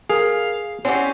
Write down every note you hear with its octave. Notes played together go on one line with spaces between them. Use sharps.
G#4 A#4 F5
C4 C#4 E4 G4 F#5